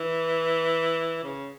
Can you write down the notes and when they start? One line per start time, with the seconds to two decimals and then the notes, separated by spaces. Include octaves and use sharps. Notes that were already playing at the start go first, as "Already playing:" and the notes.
Already playing: E3
1.23 C#3